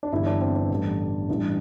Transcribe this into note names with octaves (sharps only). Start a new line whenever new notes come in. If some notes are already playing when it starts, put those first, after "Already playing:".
D4
G1 G2 E3 E4
D4
C4
D4
A1 G2 D3
A1 G2 E3